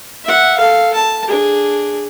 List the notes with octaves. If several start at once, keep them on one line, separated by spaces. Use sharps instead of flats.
E5 F#5
A4 F5
A5
D4 G#4